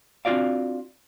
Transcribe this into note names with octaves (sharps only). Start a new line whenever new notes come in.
C4 D4 F4 F#4 D5 F5